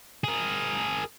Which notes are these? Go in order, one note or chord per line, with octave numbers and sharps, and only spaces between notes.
G#4 A#4